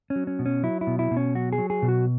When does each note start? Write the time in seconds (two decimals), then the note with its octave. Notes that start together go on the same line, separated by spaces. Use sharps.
0.10 C#4
0.16 F#3
0.27 C#4
0.39 B2
0.46 C#4
0.63 F#3 E4
0.81 E4
0.87 B2
0.99 E4
1.11 B2
1.17 C#4
1.35 F#3 F#4
1.53 G#4
1.58 F#3
1.70 G#4
1.82 B2
1.88 F#4